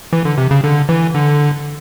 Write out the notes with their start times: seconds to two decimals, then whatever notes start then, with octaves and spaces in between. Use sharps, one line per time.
0.13 E3
0.25 D3
0.38 C3
0.51 C#3
0.64 D3
0.89 E3
1.14 D3